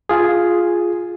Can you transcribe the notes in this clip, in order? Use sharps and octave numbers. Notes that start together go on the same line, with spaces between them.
F4 G#4